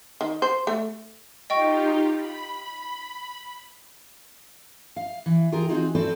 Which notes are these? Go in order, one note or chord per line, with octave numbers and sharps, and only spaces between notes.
D#3
C5
A3
D#4 F4 G4 D#5 G5 C#6
B5
F5
E3
F4 G4 G#4 A#4
C4 D4 D#4 F4 F#4 G#4
C4 F#4 A4 B4 C5 D5